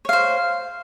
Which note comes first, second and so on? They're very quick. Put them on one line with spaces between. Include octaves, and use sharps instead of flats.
C#5 F5 C5